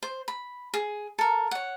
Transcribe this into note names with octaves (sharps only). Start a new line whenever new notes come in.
C5
B5
G#4
A4 A#4
C#5 F#5